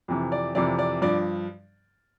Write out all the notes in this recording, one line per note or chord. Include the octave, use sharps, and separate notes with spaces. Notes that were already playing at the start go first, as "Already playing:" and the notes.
F2 C3 E3
D5
F2 C3 E3 D5
D5
G2 F3 D5